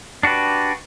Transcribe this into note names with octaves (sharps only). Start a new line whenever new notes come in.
D4 F#4 G4 B4